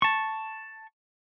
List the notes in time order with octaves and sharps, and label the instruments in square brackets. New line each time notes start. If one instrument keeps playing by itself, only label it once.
[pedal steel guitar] A5 C#6